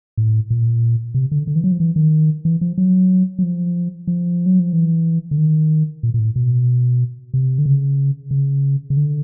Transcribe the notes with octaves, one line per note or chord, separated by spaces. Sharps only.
A2
A#2
C3
D3
D3
E3
F#3
F3
E3
D#3
E3
F3
F#3
F#3
F3
F3
F#3
F3
E3
D3
D#3
A#2
A#2
A2
B2
C3
D3
C#3
C#3
C#3
D3